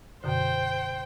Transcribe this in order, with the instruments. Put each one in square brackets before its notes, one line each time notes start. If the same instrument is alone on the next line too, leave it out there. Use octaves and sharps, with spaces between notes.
[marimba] F#2 B2 D3 [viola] C5 G5